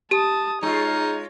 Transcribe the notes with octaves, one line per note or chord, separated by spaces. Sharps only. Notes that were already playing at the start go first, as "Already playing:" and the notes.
G4 A5 D#6 D#7
G#3 D#4 F4 C#5